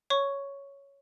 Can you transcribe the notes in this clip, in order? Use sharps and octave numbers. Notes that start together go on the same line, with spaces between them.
C#5 C#6